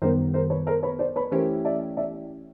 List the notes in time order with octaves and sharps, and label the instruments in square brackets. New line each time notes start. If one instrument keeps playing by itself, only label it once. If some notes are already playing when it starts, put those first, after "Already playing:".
[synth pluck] F#2 D#3 G3 B3 [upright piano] A#4 C5
[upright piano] A#4 C5
B4 C#5
A#4 C5
B4 C#5
C5 D5
B4 C#5
[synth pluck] E3 A3 C#4 E4 G4 [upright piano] A#4 C5
[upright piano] D5 E5
D5 E5